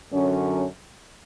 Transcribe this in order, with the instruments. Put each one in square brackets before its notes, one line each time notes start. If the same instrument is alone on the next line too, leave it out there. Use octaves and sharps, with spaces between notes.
[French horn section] F#2 D3 F#3 C#4